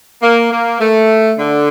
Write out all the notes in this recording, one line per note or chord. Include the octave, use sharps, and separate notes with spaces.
A#3
A#3
A3
D3